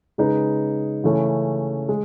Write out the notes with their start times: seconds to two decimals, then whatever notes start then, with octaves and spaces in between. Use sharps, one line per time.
0.18 C#3 G#3 D#4 G#4 B4
1.04 C#3 E3 A3 C#4
1.89 G#3